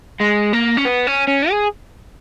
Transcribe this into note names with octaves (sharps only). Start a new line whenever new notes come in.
G#3
A#3
C#4
B3
C#4
C#4
G#4